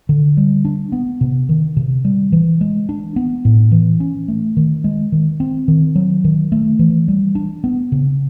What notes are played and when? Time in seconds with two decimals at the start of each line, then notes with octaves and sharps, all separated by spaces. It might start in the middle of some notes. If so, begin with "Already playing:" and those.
0.09 D3
0.37 G3
0.65 D4
0.92 B3
1.21 C3
1.49 D#3
1.77 C3
2.05 G3
2.32 E3
2.61 G#3
2.89 D4
3.16 B3
3.45 A2
3.72 E3
4.00 C#4
4.28 A3
4.57 D#3
4.84 G#3
5.12 D#3
5.40 C4
5.68 D#3
5.96 F#3
6.25 D#3
6.52 A3
6.79 E3
7.08 G3
7.35 D4
7.64 B3
7.92 C#3